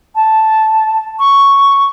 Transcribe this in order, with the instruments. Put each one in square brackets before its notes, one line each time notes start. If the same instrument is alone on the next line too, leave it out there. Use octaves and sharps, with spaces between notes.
[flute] A5
C#6